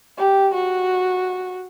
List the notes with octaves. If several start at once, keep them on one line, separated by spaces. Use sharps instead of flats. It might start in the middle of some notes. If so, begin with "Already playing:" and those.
G4
F#4